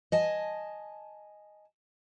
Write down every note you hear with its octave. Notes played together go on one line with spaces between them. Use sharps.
D#5 G#5 A5